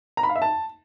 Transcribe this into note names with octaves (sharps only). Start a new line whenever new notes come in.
A#5
B5
F5
E5
A5